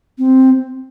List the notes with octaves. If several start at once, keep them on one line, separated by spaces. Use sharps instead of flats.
C4